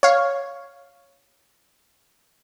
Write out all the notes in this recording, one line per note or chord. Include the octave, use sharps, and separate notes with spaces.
C#5 F5